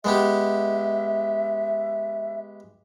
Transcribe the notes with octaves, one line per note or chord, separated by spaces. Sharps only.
G#3 B3 G4 E5